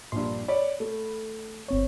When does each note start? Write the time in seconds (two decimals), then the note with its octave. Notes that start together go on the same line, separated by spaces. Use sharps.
0.12 A#1 G2 C6
0.48 C#5 D5 B5
0.80 A3
1.68 G1 C4 C#5